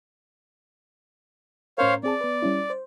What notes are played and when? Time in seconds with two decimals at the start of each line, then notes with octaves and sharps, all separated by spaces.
1.78 A2 C#4 A#4 C5 C#5 F5
2.03 C4 G#4 D5 A5
2.21 B3 B4
2.42 G3 C#4 E4
2.70 C5